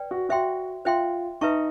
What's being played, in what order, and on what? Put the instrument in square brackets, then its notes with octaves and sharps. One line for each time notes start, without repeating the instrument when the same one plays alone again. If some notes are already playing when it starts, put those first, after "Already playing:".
Already playing: [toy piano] B4 D5 G5
[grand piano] F#4
[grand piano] F#4 [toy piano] C5 E5 G5 C6
[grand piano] F4 [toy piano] C5 E5 G5 C6
[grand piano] D#4 [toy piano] B4 E5 A5 C#6